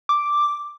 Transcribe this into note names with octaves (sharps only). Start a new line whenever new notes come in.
D6